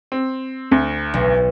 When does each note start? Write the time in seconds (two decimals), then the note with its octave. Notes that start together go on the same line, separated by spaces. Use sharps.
0.12 C4
0.71 D2
1.14 B1